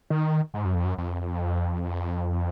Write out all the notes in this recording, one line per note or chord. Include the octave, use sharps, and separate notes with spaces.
D#3
G#2
F#2
F2
F#2
F2